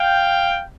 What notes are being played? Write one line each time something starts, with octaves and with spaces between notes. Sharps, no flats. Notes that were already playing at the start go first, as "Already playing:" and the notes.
Already playing: F5 G5